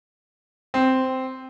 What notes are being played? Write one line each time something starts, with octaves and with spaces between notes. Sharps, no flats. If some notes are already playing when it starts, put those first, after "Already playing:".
C4